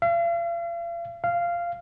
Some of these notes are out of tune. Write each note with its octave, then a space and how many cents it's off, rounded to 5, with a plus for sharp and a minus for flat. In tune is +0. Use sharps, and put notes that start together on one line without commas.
F5 -45
F5 -15